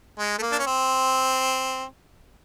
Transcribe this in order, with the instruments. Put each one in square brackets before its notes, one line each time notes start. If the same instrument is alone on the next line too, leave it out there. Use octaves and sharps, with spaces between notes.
[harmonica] G#3
A3
A#3
D4
C#4
C4